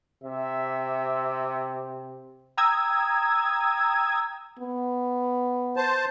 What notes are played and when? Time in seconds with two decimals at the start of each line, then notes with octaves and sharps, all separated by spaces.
0.24 C3 E5
2.57 G5 A#5 D#6 E6 G#6
4.59 B3
5.77 C5 A5